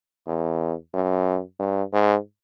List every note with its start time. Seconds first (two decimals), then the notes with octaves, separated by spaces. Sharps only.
0.27 E2
0.94 F#2
1.59 G2
1.93 G#2